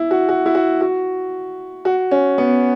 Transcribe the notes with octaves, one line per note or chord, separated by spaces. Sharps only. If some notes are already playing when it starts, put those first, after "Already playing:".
Already playing: E4
F#4
F#4
E4
F#4
F#4
F#4
C#4
B3